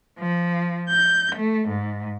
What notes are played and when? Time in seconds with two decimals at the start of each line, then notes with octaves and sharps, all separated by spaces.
0.19 F3
0.89 G6
1.37 A3
1.68 G#2